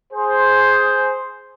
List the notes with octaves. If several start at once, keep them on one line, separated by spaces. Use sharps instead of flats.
G#4 C5